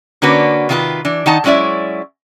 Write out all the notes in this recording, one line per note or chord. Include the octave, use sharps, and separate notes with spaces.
D3 A#3 C#4 D4 F#4 B4
C3 D#3 F4 G4 B4
E3 D4
D#3 D#4 F#5 A5
F#3 G#3 C#4 E4 D5 E5